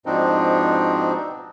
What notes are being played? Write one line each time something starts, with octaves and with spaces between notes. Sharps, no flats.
G#2 B2 F3 C4 D4 D#4